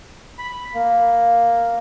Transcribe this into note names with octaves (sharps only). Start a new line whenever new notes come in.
B5
A#3